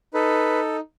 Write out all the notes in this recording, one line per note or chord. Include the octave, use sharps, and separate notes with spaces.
D#4 A4 B4